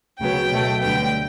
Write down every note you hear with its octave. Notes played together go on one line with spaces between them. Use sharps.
D2 C#3 F#3 B3 G5
B2 F#3 A3
D2 D3 G3 B3 G5